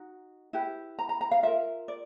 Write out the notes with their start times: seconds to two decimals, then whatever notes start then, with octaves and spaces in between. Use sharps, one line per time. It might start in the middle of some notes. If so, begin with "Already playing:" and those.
Already playing: D#4 F#4
0.53 E4 G4 B4
0.99 A#5
1.09 A#5
1.21 A#5
1.31 F5
1.43 F4 A#4 E5
1.88 D5